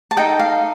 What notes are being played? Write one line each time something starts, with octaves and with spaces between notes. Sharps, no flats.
A5
D#4 A4 D#5 G5
F5